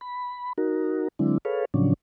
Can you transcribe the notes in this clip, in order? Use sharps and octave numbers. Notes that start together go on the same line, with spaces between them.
B5
D#4 F#4 A#4
D3 F#3 G#3 C4 D4 E4
G#4 A4 B4 C#5 F5
A2 C#3 F3 F#3 C#4 D4